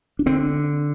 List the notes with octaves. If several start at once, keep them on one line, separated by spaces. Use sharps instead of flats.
D4
D3 C4